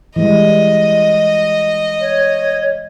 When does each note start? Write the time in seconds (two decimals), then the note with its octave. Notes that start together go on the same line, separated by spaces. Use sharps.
0.16 E3 G3 G#3 D#5
2.01 C#5